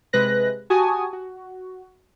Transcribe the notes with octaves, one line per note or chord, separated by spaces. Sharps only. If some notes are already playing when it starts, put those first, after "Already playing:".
C3 G#3 B4 F#6 A#6
F#4 G4 G#5 A5 C#6 D#6
F#4